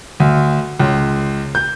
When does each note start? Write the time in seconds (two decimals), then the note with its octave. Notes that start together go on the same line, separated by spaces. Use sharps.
0.20 D2
0.80 C#2
1.55 G6